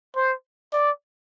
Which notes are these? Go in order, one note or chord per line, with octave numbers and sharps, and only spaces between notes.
C5
D5